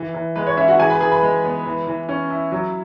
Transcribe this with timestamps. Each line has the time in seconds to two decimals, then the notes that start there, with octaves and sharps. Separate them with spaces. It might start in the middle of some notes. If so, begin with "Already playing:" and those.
Already playing: E3
0.14 E3
0.36 G#3 B4
0.47 C#5
0.57 C#4 E4 E5
0.68 F#4 F#5
0.79 E3 G#4 G#5
0.90 B4 B5
1.01 E3 G#4 G#5
1.11 B4 B5
1.22 G#3
1.44 B3
1.66 E3
1.87 E3
2.09 C#4
2.30 E4
2.52 F#3